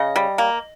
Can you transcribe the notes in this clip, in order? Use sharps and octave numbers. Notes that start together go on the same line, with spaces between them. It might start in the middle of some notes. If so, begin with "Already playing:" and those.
Already playing: C#3 D#5
G3
A#3